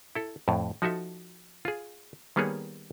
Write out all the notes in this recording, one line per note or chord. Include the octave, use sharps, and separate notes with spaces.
E4 A4
F2 A2
F3 D#4 F#4 A4 E5
F4 G#4
D#3 G3 A#3 B3 G#4 C#5